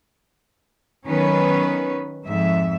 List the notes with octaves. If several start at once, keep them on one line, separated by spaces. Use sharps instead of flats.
D#3 F#3 B3 C#4 B4
F2 G#2 E5